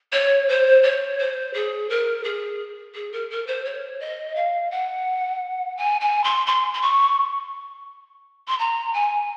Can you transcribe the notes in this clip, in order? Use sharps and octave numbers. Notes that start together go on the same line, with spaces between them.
C#5
C5
C#5
C5
G#4
A#4
G#4
G#4
A#4
A#4
C5
C#5
D#5
F5
F#5
G#5
G#5
C6
C6
C6
C#6
C6
A#5
G#5